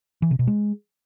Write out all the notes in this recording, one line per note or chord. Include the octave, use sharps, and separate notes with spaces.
E3
C3
B2
G#3